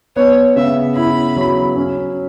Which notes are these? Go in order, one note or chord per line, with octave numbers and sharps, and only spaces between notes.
B3 C#5
C#3 E5
E4 B5
F#3
C#4